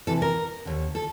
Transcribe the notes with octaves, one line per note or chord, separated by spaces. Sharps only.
D2 C3 E3 A4
A#4
D#2 D3
A4